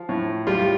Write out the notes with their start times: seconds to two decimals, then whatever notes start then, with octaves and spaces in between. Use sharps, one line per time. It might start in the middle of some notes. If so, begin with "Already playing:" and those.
Already playing: F3
0.09 A2
0.47 G3 F4